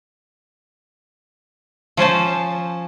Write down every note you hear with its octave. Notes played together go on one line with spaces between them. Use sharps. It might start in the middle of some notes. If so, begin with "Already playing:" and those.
F3 C#4 C5 A5